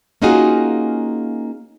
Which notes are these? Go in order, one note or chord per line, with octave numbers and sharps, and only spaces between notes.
A#3 C#4 D#4 F4 F#4 G#4